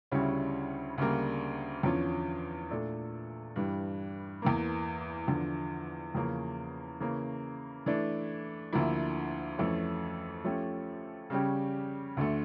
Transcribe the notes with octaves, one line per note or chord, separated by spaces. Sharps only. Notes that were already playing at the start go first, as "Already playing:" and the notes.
D2 C#3 G3 C#4 E4
D2 C#3 G3 A#3
E2 D3 F3 C#4 F4
A#2 A3 D4 A4
G2 E3 G3
E2 E3 A#3
E2 D3 F3
E2 C#3 F3 A#3 C#4
C#3 E3 A#3 C#4
E3 A3 D4
D2 D3 F3 A#3 E4
F2 E3 A3 C#4
F3 A3 C#4 G4
C#3 G3 C#4 G4
D2 D3 A3